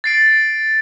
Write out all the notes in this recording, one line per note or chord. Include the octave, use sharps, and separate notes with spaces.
A6 C7 D7